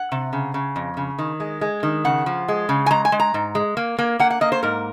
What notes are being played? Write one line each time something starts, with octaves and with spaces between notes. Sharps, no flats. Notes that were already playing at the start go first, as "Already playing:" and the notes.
Already playing: F#5
C3
C#3
C#3
F2
C#3
D#3
G#3
G#3
D#3
C#3 F#5
F3
G#3
C#3
G#5
G#3 A#5
G#5
G#3
A#5
G#2
G#3
A#3
A#3
A#3 F#5
F#5
A#3 D#5
C5
G#2 A#4